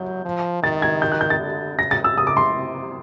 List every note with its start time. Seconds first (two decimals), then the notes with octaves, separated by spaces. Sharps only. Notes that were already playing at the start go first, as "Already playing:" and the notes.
Already playing: F#3 G6
0.25 F3
0.63 D#3 A6
0.82 G#6
1.02 G6
1.12 F#6
1.21 G6
1.30 A6
1.40 D3
1.79 C#3 A#6
1.91 A6
2.04 E6
2.18 D#6
2.27 D6
2.37 C6
2.55 C3